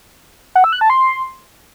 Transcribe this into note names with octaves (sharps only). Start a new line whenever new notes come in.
F#5
E6
F#6
A5
C6